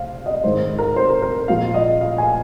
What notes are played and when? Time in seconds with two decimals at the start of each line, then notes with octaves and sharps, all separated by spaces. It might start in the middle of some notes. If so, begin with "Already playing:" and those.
Already playing: C3 C5 F5
0.26 D#5
0.44 G#2 D#3 G#3 C5
0.78 A#4
0.96 C5
1.09 A#4
1.22 A#4
1.48 A#2 F3 G#3 F5
1.74 D#5
2.01 F5
2.18 G#5